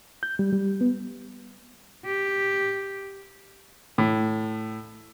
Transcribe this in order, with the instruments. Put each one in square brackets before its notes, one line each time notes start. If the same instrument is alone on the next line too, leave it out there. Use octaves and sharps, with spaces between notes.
[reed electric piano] G6
G3
G3
B3
[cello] G4
[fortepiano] A2